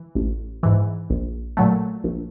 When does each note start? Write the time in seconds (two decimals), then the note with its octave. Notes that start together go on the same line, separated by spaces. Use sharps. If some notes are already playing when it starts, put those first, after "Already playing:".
Already playing: E3
0.15 A1
0.63 G#2 E3
1.10 A#1
1.57 A#2 F#3 A3
2.04 A#1